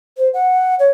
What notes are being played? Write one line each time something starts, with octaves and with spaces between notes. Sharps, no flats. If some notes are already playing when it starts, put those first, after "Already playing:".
C5
F#5
C#5